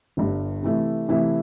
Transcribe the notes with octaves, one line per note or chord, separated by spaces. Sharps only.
G1 G2 G3
C3 E3 A3 E4
C3 E3 A3 E4